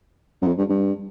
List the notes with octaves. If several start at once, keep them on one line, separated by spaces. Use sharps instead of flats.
F#2
F2
G2
G2